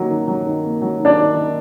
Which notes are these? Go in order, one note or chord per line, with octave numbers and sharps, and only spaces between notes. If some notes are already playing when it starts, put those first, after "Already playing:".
Already playing: D#3 F#3 A#3
D#3
F#3
D#3
A#3
F#3
D#3
D4 D5
D#3
D#3